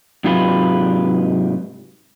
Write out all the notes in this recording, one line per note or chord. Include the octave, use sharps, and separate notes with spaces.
G#2 C3 F#3 F4 G4 B4